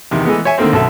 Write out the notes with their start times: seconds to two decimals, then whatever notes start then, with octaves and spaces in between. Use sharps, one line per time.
0.11 E2 C3 D#3
0.25 E3 G#3 A3 B3
0.45 C#5 E5 G#5
0.58 D3 D#3 A3 A#3 C4
0.73 B1 F#2 A4 E5